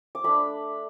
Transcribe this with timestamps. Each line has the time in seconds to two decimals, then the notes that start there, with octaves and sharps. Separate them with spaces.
0.15 D6
0.24 A3 D4 B5